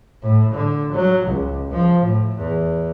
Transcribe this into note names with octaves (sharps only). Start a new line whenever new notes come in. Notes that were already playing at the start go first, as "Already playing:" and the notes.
A2
D3
F#3
C#2
F3
A2
E2